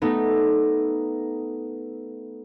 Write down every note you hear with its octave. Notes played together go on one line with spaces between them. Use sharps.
A3 B3 D#4